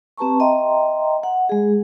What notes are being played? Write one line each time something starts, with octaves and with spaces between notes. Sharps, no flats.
C4 G4 B4 A5 A#5 C#6
D#5 E5 G5 A#5 C6
F#5
G#3 G#4